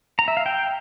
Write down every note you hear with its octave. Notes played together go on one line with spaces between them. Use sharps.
A#5
E5
F5
G5